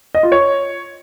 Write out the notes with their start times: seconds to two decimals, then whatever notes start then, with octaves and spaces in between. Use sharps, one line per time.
0.15 D#5
0.23 F4
0.32 C#5